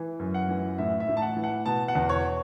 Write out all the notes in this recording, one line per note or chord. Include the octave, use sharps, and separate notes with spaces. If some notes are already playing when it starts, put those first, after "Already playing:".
Already playing: E3
F#2
F#5
E3
A2 E5
E5
A2
A5
F#5
E3
F#5
B2 A5
F#5
E2
C#5